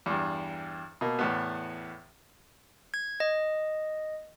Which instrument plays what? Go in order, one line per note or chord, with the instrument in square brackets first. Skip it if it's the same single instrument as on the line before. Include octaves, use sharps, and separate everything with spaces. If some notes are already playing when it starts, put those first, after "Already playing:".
[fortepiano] E2 G2
B2 A#3
E2 A2 B3
[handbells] G#6
D#5